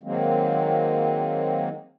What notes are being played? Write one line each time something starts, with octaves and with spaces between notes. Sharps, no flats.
D#3 F#3 G#3 A#3 C4